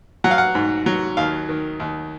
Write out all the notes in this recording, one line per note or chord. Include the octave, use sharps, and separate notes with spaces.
F#3 F#5
F5
F#5
G#2
F#3
D#2 F5
D#3
D#2